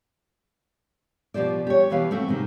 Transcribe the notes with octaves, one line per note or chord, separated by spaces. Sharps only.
B2 F3 G4 C5 D5
G4 C#5
B2 E3 G4 B4 F5
A3 C4 F#4
G#2 C3 D#3